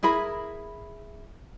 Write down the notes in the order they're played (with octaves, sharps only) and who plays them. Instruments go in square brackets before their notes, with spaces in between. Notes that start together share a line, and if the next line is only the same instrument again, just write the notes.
[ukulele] E4 G#4 A#4 B5